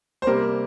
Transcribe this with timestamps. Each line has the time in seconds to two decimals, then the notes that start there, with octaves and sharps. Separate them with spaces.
0.22 C5
0.26 C3 G3 A#3 A#4